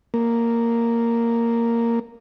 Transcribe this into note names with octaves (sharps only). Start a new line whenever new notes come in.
A#3